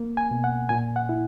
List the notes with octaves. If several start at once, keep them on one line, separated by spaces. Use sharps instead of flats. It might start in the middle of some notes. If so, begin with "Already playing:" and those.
Already playing: A#3
G#5
B2
F#5
A#2 G#5
F#5
E4